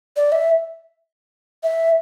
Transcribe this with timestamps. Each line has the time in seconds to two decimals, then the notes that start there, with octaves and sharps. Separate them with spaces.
0.16 D5
0.32 E5
1.63 E5